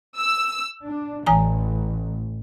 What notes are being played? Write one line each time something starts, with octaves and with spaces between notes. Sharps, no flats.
E6
D4
A1 E3 G#5 A#5